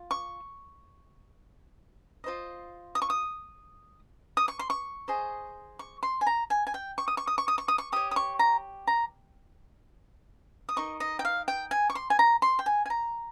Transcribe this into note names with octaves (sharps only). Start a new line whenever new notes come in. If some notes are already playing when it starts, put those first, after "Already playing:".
Already playing: F4
C#6
F4 C5 D#5
D#6
C#6
D#6
D#6
C#6
C6
C#6
G#4 C5 D#5
C#6
C6
G#5
A#5
G#5
G#5
G5
C#6
D#6
C#6
D#6
C#6
D#6
C#6
D#6
C#6
G4 C#5 D#6
D#6
C#6
A#5
A#5
D#6
D#4 A#4 D#5 C#6
D#5
G5
F5
G5
G#5
C#6
C6
G#5
A#5
C6
G5
G#5
G#5
A#5